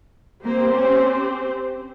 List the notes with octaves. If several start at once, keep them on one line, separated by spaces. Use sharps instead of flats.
A#3 C4 G4 C5
C#4